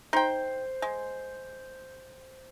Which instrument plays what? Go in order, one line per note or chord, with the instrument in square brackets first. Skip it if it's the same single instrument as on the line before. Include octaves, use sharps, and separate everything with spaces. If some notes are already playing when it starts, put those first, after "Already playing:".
[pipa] D#4 G5 [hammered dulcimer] C5
[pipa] G#3